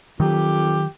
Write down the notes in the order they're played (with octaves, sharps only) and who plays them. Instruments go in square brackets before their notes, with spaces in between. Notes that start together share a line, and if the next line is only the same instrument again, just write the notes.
[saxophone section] F2 G4 [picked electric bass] D#3 F#3